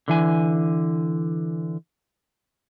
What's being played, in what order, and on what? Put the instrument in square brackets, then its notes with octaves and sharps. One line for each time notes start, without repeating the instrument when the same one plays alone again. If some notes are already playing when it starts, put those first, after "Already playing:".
[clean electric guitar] D3 E3 G#5